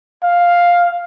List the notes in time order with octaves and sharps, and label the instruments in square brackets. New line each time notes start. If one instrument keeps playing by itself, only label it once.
[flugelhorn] F5